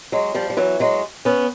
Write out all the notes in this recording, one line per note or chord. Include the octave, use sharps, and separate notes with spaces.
F#3 G#3
F3 G3
G3
E3 F#3
F#3 G#3
B3 C#4